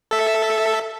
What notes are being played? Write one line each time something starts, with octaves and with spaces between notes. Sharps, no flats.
A4 E5